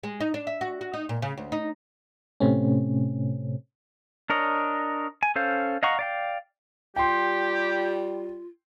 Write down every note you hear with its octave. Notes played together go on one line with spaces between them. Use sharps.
G#3
D#4
D4
E5
F#4
F#4
D#4
A#2
C#3
D2
D#4
A2 C3 A3 C4 C#4
D4 A#4 C#5 D#5
G#5
C#4 A4 C5 F5
D#5 F5 F#5 A#5 C#6
D5 F5 G5
G3 F4 G4 G5 C6